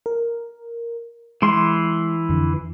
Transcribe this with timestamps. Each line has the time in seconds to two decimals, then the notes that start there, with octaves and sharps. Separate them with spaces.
0.06 A#4
1.42 E3 G#3 C6
2.29 F2 D3